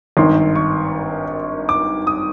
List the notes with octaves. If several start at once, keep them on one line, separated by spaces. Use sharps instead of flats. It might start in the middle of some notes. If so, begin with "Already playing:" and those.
G#1 G2 D#3 C6
C#6
D6
D#6